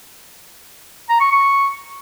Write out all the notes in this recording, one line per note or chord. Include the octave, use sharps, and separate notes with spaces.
A#5
C#6
C#6